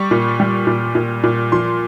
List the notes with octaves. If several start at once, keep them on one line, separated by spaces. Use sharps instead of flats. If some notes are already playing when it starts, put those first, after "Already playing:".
Already playing: G3 C#6
A#2
G3
A#2
A#2
A#2
F3 C6